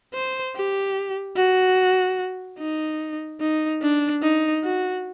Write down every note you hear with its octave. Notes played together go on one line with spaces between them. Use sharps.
C5
G4
F#4
D#4
D#4
D4
D#4
F#4